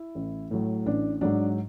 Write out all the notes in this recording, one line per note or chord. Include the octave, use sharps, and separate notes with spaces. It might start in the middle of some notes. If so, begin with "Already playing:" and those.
Already playing: E4
A1
A2 F#3
A1 D4
G#2 F#3 D4